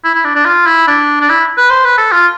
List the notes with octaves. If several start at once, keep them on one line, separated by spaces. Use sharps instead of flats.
E4
E4
D4
D4
F4
E4
D4
D4
E4
B4
C5
B4
A4
F4